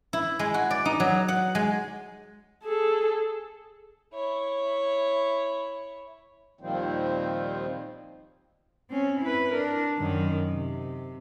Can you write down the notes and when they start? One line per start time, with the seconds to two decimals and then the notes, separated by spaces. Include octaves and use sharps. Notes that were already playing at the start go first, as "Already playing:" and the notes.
0.13 E4
0.39 G#3
0.54 F#4
0.70 D5
0.85 D#4
1.00 F#3
1.28 F#5
1.55 G#3
2.64 G#4 A4
4.14 E4 C#5
6.61 D#2 A#2 D#3 F3 G3 C4
8.89 C4 C#4
9.21 E4 B4
9.52 D4 A#4
9.98 F#2 D#3
10.51 C3